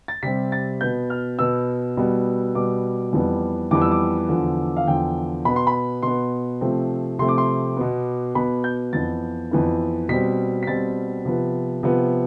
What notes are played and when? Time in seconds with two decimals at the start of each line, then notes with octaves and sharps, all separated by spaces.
0.08 A6
0.23 C3 G3 C4 B6
0.52 A6
0.81 B2 B3 G6
1.10 F6
1.39 B2 B3 E6
1.97 B2 G3 B3
2.55 B2 G3 B3 D6
3.13 F2 E3 G3 B3
3.71 F2 E3 G3 B3 D6
3.82 E6
3.92 D6
4.29 E2 D3 F3
4.77 F5
4.87 E2 D3 F3 G5
5.45 B2 B3 B5
5.56 C6
5.67 B5
6.02 B2 B3 C6
6.61 C3 F3 A3 C4
7.19 C3 F3 A3 C4 C6
7.28 D6
7.38 C6
7.77 B2 B3
8.35 B2 B3 B5
8.64 G6
8.93 F2 E3 B3 A6
9.51 F2 E3 B3
10.09 B2 G3 C4 B6
10.63 B6
10.67 B2 G3 C4 A6
11.25 C3 F3 B3
11.83 C3 F3 B3